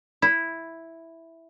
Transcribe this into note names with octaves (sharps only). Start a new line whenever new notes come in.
E4